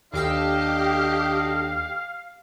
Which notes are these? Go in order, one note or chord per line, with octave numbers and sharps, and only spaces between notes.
D#2 D4 G4 A4 D#5 F5 D6 E6